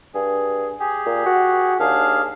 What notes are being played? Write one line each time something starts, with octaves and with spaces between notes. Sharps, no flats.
G2 G#4
G4 G#4
A#2
F#4
D#2 D4 G#4 F5